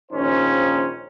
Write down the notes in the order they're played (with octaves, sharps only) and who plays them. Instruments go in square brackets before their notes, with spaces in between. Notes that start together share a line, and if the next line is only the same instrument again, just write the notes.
[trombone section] A#1 D#3 C#4 D#4 C5